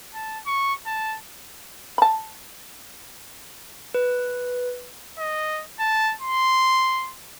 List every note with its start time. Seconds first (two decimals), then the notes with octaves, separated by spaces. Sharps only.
0.14 A5
0.46 C#6
0.86 A5
1.98 A5 B5
3.94 B4
5.19 D#5
5.79 A5
6.21 C6